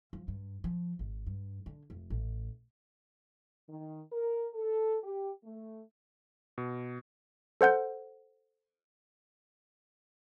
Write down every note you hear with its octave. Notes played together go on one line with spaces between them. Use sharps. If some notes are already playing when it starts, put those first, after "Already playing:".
F3
G2
F3
G#1
G2
D3
F1
A1
D#3
A#4
A4
G4
A3
B2
A4 C5 F#5 G6